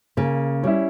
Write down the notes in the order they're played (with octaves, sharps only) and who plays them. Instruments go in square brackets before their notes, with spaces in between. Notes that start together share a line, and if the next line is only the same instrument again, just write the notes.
[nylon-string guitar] C#3 [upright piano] A#3
[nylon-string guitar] G3 [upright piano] C#4 E4